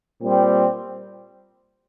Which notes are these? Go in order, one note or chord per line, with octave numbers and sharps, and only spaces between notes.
A#2 G3 C4